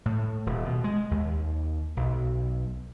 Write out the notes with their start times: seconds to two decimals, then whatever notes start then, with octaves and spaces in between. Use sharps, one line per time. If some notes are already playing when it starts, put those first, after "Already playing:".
0.06 A2
0.46 D#1
0.65 B2
0.84 G#3
1.11 D#2
1.97 B1